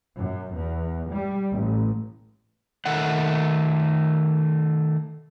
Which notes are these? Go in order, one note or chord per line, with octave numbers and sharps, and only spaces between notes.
F#2
E2
G3
A1
D#3 A3 F#5